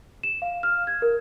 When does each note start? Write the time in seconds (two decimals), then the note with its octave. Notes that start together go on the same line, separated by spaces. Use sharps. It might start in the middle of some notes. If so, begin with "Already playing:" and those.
0.23 E7
0.42 F5
0.63 F6
0.87 G#6
1.02 A#4